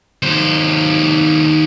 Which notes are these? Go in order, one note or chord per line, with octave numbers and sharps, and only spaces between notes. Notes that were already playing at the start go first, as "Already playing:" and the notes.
D#2 C5